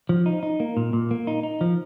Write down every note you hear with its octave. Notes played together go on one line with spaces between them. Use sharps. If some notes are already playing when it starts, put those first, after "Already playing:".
F3
D#4
D#4
A#3
A#2
A#2
A#3
D#4
D#4
F3